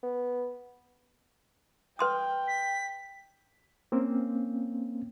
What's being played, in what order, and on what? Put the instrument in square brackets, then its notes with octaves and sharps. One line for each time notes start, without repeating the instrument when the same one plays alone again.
[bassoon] B3
[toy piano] B4 C6 D#6 [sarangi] G5
[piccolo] B6
[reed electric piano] A#3 C4 C#4